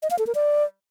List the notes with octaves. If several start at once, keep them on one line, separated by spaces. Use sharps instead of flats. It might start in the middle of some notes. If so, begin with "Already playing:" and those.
D#5
F5
A4
A#4
D5